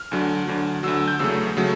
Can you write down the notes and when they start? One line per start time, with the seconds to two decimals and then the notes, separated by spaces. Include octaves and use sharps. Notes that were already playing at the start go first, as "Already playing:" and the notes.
Already playing: F6
0.11 D2 D3 F#3
0.47 D2 D3 F#3
0.83 D2 D3 F#3 E6
0.95 E6
1.08 G6
1.19 E2 C#3 F#3 A3 E6
1.57 C#3 F#3 A3